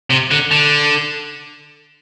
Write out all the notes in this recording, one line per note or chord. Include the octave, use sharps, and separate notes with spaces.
C3
D3
D3